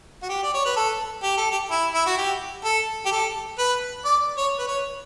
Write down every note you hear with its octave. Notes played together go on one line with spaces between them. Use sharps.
F#4
G4
D5
C#5
B4
A4
G4
A4
G4
E4
E4
F#4
G4
A4
G4
A4
B4
D5
C#5
B4
C#5